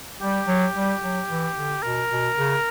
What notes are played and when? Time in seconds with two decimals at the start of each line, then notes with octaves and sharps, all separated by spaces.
0.21 G3 G4
0.47 F#3
0.75 G3
1.02 F#3
1.29 E3
1.56 D3
1.82 B2 A#4
2.10 B2
2.37 C#3